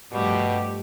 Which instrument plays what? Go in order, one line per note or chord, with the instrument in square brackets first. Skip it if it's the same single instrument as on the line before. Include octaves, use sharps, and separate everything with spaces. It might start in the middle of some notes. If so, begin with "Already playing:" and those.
[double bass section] G2 F3 [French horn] B2 [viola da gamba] G3 A3 G4